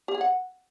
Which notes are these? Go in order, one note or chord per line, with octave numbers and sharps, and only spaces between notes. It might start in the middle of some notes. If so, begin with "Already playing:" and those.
G4
G#4
F#5